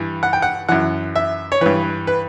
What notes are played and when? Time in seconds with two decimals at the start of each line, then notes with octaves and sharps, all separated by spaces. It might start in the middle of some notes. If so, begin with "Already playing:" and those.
Already playing: G2 E3
0.23 F#5
0.33 G5
0.42 F#5
0.69 F#2 E3 F#5
1.15 E5
1.52 C#5
1.61 G2 E3 B4
2.07 B4